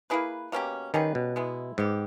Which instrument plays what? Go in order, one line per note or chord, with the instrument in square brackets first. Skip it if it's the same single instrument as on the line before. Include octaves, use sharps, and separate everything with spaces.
[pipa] A#3 E4 G#4 B4
B2 A#3 C#4 G4
[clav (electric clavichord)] D#3 [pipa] G3 C#4 G#4 B4
[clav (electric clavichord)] B2
[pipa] G#3 B3 E4
[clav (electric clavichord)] G#2 [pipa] G3 B3 G4